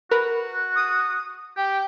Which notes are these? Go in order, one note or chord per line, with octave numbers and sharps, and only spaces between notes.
F#4 A#4 B4
D#6
G4 G5